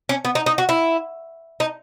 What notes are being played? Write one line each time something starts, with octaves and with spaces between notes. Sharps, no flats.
C#4
B3
D#4
D#4
F#4
E4
D#4